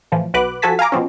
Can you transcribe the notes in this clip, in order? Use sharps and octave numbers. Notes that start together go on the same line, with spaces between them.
A2 E3 F3
B1 F#4 B4 D6 F#6
F3 F#4 A4 G#5 A5 B6
F5 G#5 A#5 D6
B2 F3 C4 C#4